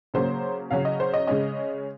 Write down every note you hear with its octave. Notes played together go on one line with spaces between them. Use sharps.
C#3 F#3 A#3 C#4 C5
C#3 F#3 C#4 F5
D#5
C5
D#5
C#3 G#3 C#4 D#5